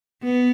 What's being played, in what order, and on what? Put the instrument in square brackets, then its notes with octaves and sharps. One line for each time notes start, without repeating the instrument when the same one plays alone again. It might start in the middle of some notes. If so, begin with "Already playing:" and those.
[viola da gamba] B3